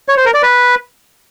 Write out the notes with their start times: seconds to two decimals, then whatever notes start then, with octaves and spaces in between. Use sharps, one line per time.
0.08 C#5
0.17 C5
0.25 A#4
0.34 D5
0.43 B4